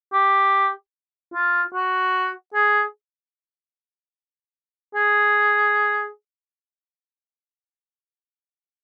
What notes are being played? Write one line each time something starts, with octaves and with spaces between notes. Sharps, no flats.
G4
F4
F#4
G#4
G#4